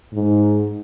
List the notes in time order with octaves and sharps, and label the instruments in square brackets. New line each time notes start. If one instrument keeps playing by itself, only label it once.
[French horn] G#2